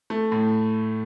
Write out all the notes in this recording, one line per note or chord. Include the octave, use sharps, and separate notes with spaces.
A3
A2